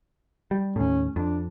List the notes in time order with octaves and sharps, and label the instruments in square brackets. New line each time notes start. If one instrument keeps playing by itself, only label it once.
[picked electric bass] G3
[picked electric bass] D#2 A2 [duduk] C#4
[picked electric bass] F2 [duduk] D4